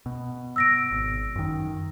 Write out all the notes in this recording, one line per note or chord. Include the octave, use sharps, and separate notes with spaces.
B2
E6 A#6 D7
G#1
F#2 D#3